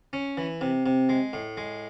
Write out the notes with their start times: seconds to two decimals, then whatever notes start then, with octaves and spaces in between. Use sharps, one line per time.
0.13 C#4
0.37 E3
0.61 C3
0.86 C3
1.09 G#3
1.33 A2
1.57 G#3